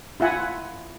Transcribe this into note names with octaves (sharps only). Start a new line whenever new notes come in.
E4 F4 E5 F#5 G#5